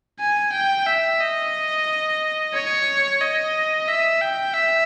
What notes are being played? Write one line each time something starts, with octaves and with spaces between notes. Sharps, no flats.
G#5
G5
E5
D#5
C#5
D#5
E5
G5
E5